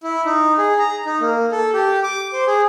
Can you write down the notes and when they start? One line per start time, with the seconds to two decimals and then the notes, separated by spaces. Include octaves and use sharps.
0.03 E4
0.25 D#4
0.58 G#4
0.79 A#5
1.06 D#4
1.21 A#3
1.52 A4
1.74 G4
2.03 D6
2.33 C5
2.47 G#4